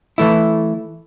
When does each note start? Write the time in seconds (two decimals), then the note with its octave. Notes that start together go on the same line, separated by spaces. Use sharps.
0.18 E3 A3 E4